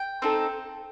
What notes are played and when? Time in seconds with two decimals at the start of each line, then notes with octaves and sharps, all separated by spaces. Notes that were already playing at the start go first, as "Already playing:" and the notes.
Already playing: G5
0.22 C4 D#4 A4